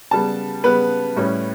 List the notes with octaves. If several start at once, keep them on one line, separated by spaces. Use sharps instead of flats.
C#3 G3 B3 A5
C#3 G3 B3 B4
A2 G3 C#4